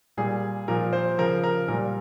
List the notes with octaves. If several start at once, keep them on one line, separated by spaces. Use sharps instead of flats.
A#2 G3 G#4
A#2 F3 A#4
C5
C#3 F3 A#4
A#4
A#2 G3 A#4